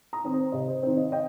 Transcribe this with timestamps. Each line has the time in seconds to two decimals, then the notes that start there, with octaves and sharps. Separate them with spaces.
0.13 A#5 D#6
0.24 D#3 C4
0.33 C5
0.52 C3 D#5
0.68 C5
0.83 D#3 C4 C5
0.97 D#5
1.12 D#5 G5